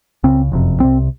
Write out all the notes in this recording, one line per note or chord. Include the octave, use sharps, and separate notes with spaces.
C#2 C#3 C4
F#1 F2 C3
C2 C3 C4